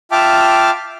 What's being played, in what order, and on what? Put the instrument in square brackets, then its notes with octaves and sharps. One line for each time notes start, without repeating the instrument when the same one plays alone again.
[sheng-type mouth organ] F4 E5 G5 A5 D6 F6